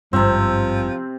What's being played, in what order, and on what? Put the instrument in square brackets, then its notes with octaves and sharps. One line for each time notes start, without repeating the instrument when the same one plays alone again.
[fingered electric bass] G#1 G2 [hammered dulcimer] C3 C4 [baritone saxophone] F3